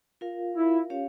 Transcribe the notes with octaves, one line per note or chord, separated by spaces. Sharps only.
F4 A#4 F5
E4
C#4 G4 C#5 F5